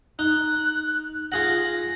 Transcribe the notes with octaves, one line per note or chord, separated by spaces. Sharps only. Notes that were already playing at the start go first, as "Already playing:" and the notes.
D#4 F#6
F4 G#4 F#5 A#6